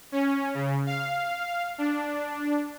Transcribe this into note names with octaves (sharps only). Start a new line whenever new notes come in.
C#4
C#3
F5
D4